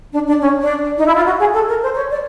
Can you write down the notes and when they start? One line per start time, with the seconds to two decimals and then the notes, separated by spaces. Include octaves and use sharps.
0.12 D4
0.27 D4
0.41 C#4
0.60 D4
0.97 D#4
1.06 E4
1.15 F4
1.25 F#4
1.39 G#4
1.53 A4
1.68 A#4
1.82 C5
1.95 C#5
2.10 D5